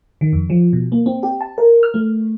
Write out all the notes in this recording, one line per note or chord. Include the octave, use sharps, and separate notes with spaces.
D#3
F2
F3
B2
A#3
C4
G4
A5
A#4
F6
A3